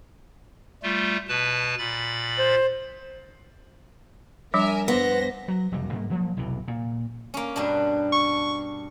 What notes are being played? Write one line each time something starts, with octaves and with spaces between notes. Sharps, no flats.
G3 A3 F4
B2 B4 A5
A#2 B5 A6
C5
F3 G3 D4 A#4 E5 G#5
G2 B3 C5 A#6
F#3
F#1 F2 C3 G3
G#2 G3 A3 A#3
F3 F#3 A#3
B1 E2 C3 E3
A#2
A#3 C#4
G2 B2 D4
C#6